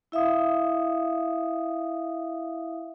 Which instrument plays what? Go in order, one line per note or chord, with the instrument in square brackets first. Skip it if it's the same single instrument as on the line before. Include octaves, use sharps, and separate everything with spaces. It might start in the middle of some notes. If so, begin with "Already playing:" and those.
[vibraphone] E4 E5 F5 D#6